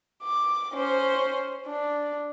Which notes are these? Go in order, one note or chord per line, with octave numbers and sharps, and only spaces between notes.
D6
C#4 C5
D4